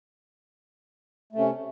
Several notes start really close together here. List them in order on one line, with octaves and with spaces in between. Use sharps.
A3 C3 C#4